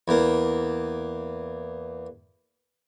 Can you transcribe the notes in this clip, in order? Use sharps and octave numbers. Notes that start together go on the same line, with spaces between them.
E2 A#3